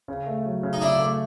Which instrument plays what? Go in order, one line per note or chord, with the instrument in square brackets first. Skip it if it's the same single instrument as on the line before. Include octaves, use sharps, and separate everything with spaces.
[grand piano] C#3
A3
F#3
C#3
[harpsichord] D#4
[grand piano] C#3 [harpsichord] D4 E4
[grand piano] A3